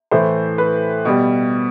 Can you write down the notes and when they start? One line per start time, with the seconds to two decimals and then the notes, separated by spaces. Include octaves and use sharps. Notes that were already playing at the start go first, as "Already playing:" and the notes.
0.11 A2 E3 A3 C5
0.58 B4
1.05 B2 G3